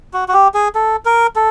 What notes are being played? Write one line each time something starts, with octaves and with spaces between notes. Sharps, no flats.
F#4
F#4
G4
G#4
A4
A#4
A4